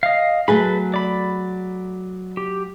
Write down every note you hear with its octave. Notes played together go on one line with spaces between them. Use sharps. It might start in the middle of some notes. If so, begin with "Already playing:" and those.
D#5 F5
F#3 A3 G#4 A4 B4 B5
D5 B5
G4